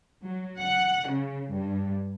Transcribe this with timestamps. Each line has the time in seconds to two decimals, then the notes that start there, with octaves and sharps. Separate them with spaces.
0.24 F#3
0.61 F#5
1.11 C#3
1.52 G2